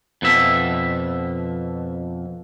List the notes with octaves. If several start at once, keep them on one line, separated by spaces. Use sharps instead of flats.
F2 B2 E5